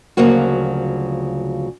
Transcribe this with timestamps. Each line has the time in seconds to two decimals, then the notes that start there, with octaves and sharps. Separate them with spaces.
0.17 D2 C#3 F3 F#3 A#3 F#4